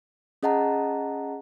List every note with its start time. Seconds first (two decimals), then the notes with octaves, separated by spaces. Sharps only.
0.43 C#4 G#4 D#5 F#5 A5 A#5